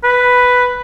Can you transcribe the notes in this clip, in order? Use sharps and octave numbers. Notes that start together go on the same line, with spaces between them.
B4